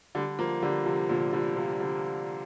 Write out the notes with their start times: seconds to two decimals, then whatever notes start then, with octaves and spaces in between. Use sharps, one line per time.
0.15 D3 G3
0.39 F3 A#3
0.62 D3 G3
0.86 C3 F3
1.09 A#2 D3
1.33 D3 G3
1.56 C3 F3
1.80 D3 G3